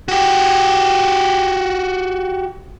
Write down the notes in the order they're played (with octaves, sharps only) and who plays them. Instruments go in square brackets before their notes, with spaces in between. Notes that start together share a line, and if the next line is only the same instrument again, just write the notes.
[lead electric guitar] F#4 G4